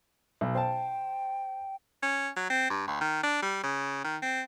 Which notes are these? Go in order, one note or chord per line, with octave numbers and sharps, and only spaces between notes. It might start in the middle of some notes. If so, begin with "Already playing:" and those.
B1
C5 G5 A5
C#4
F#3
C4
G2
D2
D#3
D4
G3
C#3
D#3
C4